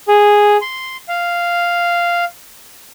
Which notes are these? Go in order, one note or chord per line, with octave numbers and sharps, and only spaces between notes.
G#4
C6
F5